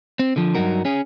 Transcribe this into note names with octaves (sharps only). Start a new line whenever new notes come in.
C4
D3 F3
G2 F#3 D#4 F#4 A#4
C#4 G#4